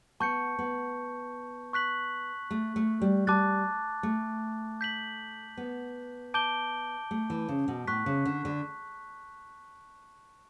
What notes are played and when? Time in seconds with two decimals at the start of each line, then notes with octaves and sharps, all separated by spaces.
0.20 B3 A5 C#6 G6 C#7
0.59 B3
1.73 C#6 F#6 B6 F#7
2.51 A3
2.76 A3
3.02 G3
3.27 G3 A5 D6 F#6 A6
4.03 A3
4.81 G6 B6 F#7
5.57 B3
6.34 A5 D6 G6 D7 G7
7.11 A3
7.30 E3
7.49 C#3
7.68 B2
7.87 A2 C#6 F#6 B6
8.06 C#3
8.25 D3
8.45 D3